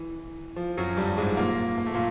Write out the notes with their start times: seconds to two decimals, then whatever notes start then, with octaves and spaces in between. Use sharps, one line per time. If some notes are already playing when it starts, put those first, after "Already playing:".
Already playing: E3
0.56 F3
0.77 F#2 F#3
0.97 G2 G3
1.17 G#2 G#3
1.37 A#2 A#3
1.78 A#3
1.86 A3
1.94 A#2 A#3